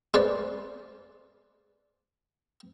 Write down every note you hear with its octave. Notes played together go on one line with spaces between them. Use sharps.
G#3 B4 C5 D5